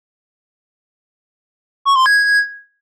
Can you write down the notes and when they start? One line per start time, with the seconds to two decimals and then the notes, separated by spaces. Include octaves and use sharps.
1.85 C#6
1.96 C6
2.06 G#6